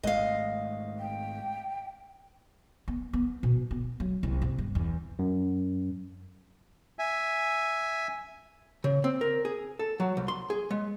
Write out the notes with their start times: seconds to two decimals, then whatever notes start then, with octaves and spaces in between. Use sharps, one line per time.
0.03 G#1 G#3 A3 D#5 F5
0.99 G5
2.88 B3
3.13 B3
3.43 B2
3.71 B3
4.00 F#3
4.23 C2
4.42 C3
4.58 G2
4.75 E2
5.19 F#2
6.99 E5 G#5
8.84 C#3
9.04 C4
9.21 A#4
9.45 G#4
9.79 A4
10.00 F#3
10.17 C2
10.28 C6
10.50 G#4
10.71 G#3